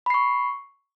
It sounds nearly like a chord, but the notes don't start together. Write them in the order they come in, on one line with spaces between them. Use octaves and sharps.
B5 C7 C#6